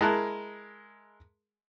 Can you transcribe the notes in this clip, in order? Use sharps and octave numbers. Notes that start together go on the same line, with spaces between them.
G#3 E4 A#4 A5 F#6